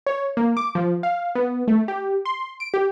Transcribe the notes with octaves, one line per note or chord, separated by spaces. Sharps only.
C#5
A#3
D6
F3
F5
B3
A3
G4
C6
D7
G4